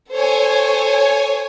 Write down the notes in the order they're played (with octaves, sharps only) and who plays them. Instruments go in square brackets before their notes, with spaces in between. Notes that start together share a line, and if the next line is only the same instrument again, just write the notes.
[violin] A4 C5 [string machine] C#5 G#5